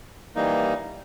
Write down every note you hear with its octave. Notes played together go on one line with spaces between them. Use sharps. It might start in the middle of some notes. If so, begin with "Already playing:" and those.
E3 G3 A#3 D#4